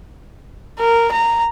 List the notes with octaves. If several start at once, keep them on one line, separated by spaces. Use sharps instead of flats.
A#4
A#5